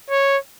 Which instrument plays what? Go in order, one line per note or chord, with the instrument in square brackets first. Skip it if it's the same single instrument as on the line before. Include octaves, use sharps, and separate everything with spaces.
[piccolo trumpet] C#5